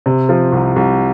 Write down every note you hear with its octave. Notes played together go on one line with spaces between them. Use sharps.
C3
F3
C2
C2